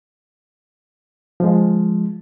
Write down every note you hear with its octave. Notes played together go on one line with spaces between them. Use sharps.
F3 G#3